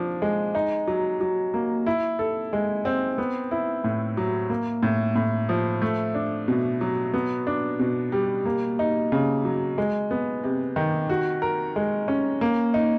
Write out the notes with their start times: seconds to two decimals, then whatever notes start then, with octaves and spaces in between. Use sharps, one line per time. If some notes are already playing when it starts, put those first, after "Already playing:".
Already playing: F3 D4
0.22 G#3
0.55 D#4
0.87 F#3
1.21 F#3
1.54 A#3
1.86 E4
2.19 A4
2.53 G#3
2.85 C4
3.18 B3
3.51 E4
3.84 A2
4.17 F#3
4.50 A#3
4.83 A2
5.15 A2
5.49 F3
5.82 A3
6.14 D4
6.48 B2
6.81 F#3
7.14 B3
7.47 D4
7.79 B2
8.12 G3
8.45 A#3
8.79 D#4
9.12 C#3
9.45 F#3
9.78 G#3
10.11 B3
10.44 C3
10.76 D#3
11.10 F#4
11.42 A#4
11.76 G#3
12.08 C#4
12.41 A#3
12.74 D#4